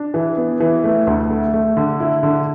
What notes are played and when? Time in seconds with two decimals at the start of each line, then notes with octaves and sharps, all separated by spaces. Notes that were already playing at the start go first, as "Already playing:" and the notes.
Already playing: D4
0.14 E3
0.37 B3
0.60 E3
0.84 A3
1.07 D2
1.30 A3
1.54 A3
1.77 D3
2.00 E4
2.23 D3